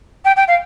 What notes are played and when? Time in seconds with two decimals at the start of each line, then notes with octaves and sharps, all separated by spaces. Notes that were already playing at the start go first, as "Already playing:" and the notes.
0.25 G5
0.36 G5
0.47 F5